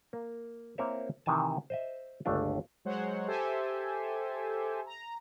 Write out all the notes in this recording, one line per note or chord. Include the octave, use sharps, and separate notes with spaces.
A#3
A#3 C4 E4 A#4 C#5 E5
C3 D#3 E3 G#5 A5
C5 D#5 E5
G1 C#2 A3 D4 F5
F#3 G#3 C5 C#5 F#5
G4 A4 C5 E5 G#5
A#5